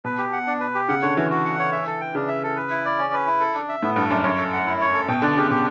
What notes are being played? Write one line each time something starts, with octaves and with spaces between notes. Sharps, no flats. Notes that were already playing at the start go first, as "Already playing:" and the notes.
B2 B4
G4
F#5
D4
B4
G4
C#3 F#5
D3 C#5
E3 F#4
F#4
F#5
C#5
E5
A4
G5
C#3 D4
E5
A4
B4
E4
D5
C#4
B4
E4
A4
D4
E5
A2 B3
G2 A4
F#2 D4
F#2 C#5
A4
F#5
E4
C#5
A4
B2 G5
D3 D5
C#3 G4
B2 G4